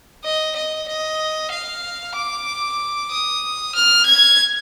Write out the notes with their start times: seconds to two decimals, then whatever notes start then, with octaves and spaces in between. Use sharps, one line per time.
0.24 D#5
0.56 D#5
0.88 D#5
1.51 F5
2.15 D6
3.10 D#6
3.75 F6
4.06 G#6